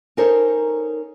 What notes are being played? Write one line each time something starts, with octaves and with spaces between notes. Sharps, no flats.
C#4 D#4 A4 A#4 C5 C#5